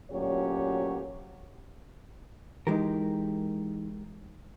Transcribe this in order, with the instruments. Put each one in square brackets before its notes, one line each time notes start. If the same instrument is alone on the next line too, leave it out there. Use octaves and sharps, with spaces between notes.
[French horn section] D2 A#2 F#3 C#4 G4 C#5
[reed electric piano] E3 D#4 [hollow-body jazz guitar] G#3 G4 A#4